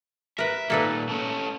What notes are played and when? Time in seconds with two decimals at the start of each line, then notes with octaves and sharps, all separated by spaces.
0.38 A#4 B4 E5
0.70 A#2 D#3 A#3 A4 B4
1.09 A3 C#4